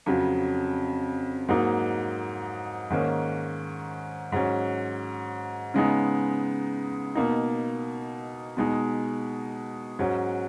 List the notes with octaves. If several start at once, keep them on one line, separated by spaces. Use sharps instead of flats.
F2 C#3 F#3
G#2 F#3 A#3 D#4
G#2 D#3 A#3 C#4
G#2 F#3 C#4
C#3 G#3 B3 D#4
B2 A#3 D#4
B2 G#3 D#4
G#2 F#3 C#4